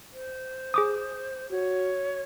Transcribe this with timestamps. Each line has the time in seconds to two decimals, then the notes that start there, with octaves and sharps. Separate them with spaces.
0.13 C5
0.74 G#4 D6 D#6
1.51 F#4 C#5